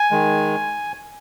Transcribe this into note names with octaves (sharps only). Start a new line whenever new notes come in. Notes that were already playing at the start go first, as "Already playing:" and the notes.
Already playing: G#5
D#3 G#3